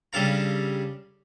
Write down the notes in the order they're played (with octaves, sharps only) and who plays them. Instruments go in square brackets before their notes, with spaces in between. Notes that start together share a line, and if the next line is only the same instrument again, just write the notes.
[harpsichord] C#3 G3 D4 A4 F5 A#5